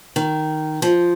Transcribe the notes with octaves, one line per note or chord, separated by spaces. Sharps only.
D#3
F3